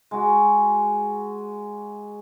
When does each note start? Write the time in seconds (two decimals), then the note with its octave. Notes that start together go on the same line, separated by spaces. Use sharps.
0.11 G#3 F#4